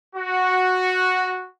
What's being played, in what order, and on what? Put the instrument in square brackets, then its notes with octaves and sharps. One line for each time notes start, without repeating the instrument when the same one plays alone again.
[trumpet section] F#4